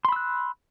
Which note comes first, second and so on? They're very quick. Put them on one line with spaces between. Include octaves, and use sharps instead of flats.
C6 B5 E6 F#6